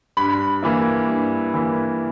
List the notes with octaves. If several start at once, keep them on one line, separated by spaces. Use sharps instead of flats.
G2 B5
E3 A#3 E4
G2
E3 A#3 E4